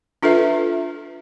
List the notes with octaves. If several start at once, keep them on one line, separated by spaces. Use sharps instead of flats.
D4 F4 A4 B4 E5